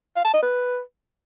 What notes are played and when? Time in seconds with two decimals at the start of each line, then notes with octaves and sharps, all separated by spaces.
0.16 F5
0.25 A5
0.34 D#5
0.43 B4